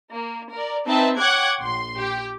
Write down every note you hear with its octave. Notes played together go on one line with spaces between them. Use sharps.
A#3
A#4 D5
C4 D#4 B4 E5 A5
C#5 F#5 G5 D6 F#6 G#6
A#1 C6
G4